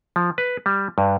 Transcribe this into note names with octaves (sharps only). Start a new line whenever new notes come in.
F3
B4
G3
G2